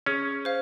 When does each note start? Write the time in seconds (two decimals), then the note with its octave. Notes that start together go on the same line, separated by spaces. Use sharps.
0.06 C#4 G#4
0.45 C5 F5